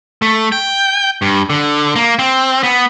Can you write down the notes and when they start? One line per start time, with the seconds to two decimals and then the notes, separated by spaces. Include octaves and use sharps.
0.22 A3
0.52 G5
1.22 G2
1.50 D3
1.96 A#3
2.19 C4
2.63 B3